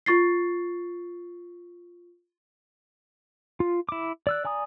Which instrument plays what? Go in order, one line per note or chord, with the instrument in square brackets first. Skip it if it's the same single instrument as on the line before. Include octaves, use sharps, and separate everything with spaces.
[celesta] F4 C#6 A6 C7
[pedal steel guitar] F4
E4 D6
D5 E6 F#6
D5 G#5 A#5 D#6